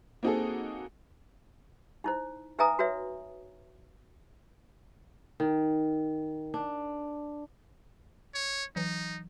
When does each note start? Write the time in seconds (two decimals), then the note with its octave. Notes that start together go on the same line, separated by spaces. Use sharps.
0.23 A#3 C4 D#4 F#4 G#4 A4
2.04 D#4 E4 C5
2.58 D#4 B4 E5 G#5 A#5 D#6
2.79 F#4 B4 C#5 E5
5.40 D#3
6.54 D4
8.34 C#5
8.76 E3 F#3 D#4